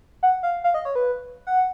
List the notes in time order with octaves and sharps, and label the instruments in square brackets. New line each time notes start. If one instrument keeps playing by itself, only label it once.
[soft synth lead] F#5
F5
F5
D#5
C#5
B4
F#5